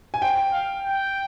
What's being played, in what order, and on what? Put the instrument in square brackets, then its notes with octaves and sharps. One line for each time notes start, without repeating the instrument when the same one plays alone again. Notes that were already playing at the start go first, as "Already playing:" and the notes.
[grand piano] G#5
[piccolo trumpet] C5 [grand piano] G5
[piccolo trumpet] F5
G5